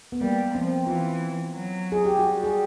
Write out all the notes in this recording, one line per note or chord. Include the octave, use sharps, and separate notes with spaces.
B3
G3 A#3
F3 C4
E3 F4
F#3
G#4
G4
G3 F#4
G#4